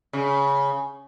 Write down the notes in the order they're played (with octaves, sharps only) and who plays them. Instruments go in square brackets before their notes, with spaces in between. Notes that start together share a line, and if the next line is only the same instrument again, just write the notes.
[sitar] C#3